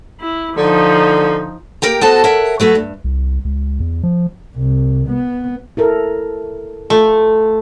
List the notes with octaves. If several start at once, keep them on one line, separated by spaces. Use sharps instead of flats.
E4
D3 F3 D#4
A#3 G4 A#4 G5 A#5
B3 F#4 A4 C5 D#5 A5
A#4 C#5 E5 F#5
F#3 A3 F#4 B4
G2
C2
C#2
E2
F3
C2
B3
E4 A4 A#4
A3 F4